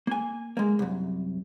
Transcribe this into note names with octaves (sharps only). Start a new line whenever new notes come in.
A#3 G#5
G#3 A#3
C2 F#2